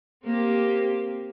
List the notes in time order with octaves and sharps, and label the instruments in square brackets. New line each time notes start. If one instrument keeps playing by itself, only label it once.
[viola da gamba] A#3 C4 G4